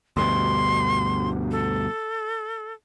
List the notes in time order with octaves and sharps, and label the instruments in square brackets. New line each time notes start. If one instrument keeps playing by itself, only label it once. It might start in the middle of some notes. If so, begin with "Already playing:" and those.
[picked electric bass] D2 G2 B2 [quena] C6
[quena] A4